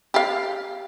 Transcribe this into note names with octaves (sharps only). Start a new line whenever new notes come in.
G4 F5